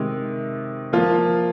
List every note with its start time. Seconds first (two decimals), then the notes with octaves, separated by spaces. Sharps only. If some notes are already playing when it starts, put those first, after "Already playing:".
Already playing: C3 D#3 G#3
0.92 F3 A#3 F4